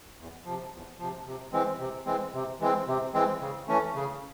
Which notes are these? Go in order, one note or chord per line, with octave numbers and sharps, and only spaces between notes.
E2
C3 F3
E2
C3 F3
C3
E3 G#3 C4
C3
E3 G#3 C4
C3
E3 G#3 C4
C3
E3 G#3 C4
C#3
E3 A3 C#4
C#3